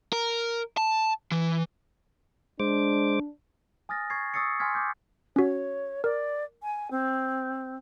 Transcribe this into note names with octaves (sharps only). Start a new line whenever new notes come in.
A#4
A5
E3
G#3 D4 C5 D6
G#5 D#6 F6 A6 A#6
C#6 G#6 A6 C7
C#6 D#6 E6 A6 C7 C#7
G#5 C6 D#6 F6 G#6 B6
D6 G6
C#4 F#4 C#5
A#4 D5
G#5
C4